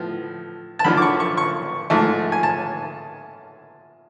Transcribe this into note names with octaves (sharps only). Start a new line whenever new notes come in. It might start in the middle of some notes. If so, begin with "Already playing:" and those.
Already playing: A2 F3 B3
A5
F#2 D3 F3 B5
D6
C#6
C#6
C#6
G#2 F3 A3
G#5
A5